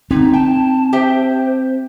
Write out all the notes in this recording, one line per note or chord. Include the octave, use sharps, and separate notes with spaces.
D3 C4 D#4
G5 A5
G4 C5 E5 G5